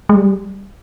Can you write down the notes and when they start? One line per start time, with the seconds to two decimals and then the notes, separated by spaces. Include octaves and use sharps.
0.09 G#3
0.15 G3